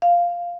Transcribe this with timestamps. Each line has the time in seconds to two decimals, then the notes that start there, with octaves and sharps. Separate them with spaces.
0.02 F5